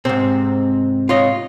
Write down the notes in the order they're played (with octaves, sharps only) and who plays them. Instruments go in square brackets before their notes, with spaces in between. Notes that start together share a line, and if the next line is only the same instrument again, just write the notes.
[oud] G#2 C3 [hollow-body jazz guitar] C4
[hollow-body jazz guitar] F4 C#5 D#5